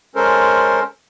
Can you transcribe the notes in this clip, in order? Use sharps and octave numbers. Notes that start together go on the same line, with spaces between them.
G#3 C#4 A4 A#4 C5